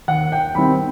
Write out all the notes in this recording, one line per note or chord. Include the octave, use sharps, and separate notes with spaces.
D#2 F#5
G5
D#3 G3 C4 E4 B5